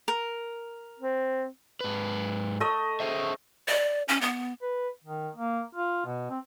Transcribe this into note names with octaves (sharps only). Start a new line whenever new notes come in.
A#4
C4
G#2 B4
A3 D#5
G#4 C5 E5
D5
C#4
B3
B4
D#3
A#3
F4
B2
C4